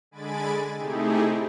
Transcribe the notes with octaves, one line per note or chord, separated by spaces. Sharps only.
D3 G#3 G#5 B5 A6 D7
C3 A3 D#4 E4 G4 G#4